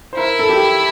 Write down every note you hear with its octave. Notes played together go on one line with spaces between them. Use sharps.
C5
E4 A#4
A4
G4